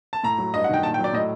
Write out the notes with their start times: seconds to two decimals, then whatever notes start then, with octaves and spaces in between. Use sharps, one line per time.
0.13 A5
0.23 A2 A#5
0.38 F#3
0.54 G2 D#5
0.64 F#5
0.69 D#3 G5
0.83 A#2 A5
0.94 G5
0.99 F#3
1.04 D5
1.13 A2 D#5